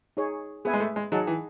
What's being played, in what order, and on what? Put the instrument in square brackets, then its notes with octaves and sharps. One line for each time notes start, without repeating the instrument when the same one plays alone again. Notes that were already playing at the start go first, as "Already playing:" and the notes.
[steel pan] D#4 G#4 C#5
[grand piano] B3 [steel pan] G#4 B4 E5 G#5
[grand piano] G#3
A3
G#3
[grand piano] F#3 [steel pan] D#4 G#4 D#5 F#5 A5
[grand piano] E3